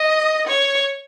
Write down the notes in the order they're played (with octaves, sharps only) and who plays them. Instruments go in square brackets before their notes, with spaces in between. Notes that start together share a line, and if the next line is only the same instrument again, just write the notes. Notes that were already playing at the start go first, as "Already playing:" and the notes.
Already playing: [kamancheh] D#5
C#5